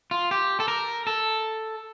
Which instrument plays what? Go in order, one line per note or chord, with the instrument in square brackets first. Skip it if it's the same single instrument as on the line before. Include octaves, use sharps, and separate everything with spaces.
[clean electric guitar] F4
G4
A4
A#4
A4